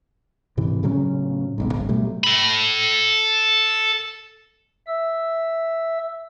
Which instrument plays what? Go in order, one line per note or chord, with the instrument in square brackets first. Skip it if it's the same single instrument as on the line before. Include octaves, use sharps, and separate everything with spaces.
[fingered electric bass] G#2 C3 E3
A2 C#3 F#3 C#4
D1 B1 G#2
G#1 C#2
B2 F#3 G3 A3
[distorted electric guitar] A4 B5
[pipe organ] E5 E6